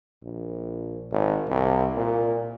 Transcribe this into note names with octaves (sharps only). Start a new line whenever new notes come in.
A#1
G#1
C2
A#2